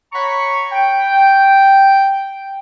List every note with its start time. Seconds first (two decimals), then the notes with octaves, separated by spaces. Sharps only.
0.13 C#5 F#5 A#5 B5 C#6
0.71 G5